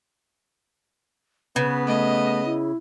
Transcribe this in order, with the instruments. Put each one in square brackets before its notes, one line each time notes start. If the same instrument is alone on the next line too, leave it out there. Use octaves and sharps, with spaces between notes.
[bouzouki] C#3 [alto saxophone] B3 [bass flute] B4
[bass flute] A3 [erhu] D#5
[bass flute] E4